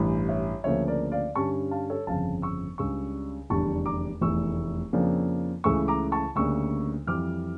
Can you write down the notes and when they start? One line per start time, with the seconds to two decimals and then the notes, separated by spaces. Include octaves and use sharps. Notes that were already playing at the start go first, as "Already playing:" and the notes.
Already playing: A1 G2 E3
0.29 C#5 E5
0.64 D2 C#3 F3 A#3 C#5 E5
0.88 A#4 D5
1.12 D5 F5
1.35 G2 D3 G3 C#4 A5 C#6
1.71 F5 A5
1.90 A4 C#5
2.07 G1 F2 C#3 F3 F5 A5
2.42 C#6 E6
2.78 C#2 C#3 G3 D4 C#6 E6
3.50 F1 E2 D3 G3 D4 A5 C#6
3.86 A#5 D6
4.21 F1 E2 E3 A3 C#6 E6
4.93 F2 C#3 F3 A#3 D4
5.64 C#2 C#3 E3 A3 C#6 E6
5.88 A#5 D6
6.12 A5 C#6
6.35 D2 C#3 G3 A#3 D4 C#6 E6
7.07 F2 E3 G3 D6 F6